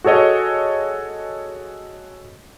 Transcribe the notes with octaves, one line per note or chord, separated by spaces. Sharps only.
F#4 G#4 A4 C#5 D#5